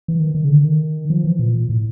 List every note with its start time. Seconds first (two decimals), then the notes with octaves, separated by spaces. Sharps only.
0.08 E3
0.20 D#3
0.35 D#3
0.44 C#3
0.50 D3
0.65 D#3
1.10 F3
1.24 E3
1.39 A#2
1.69 A2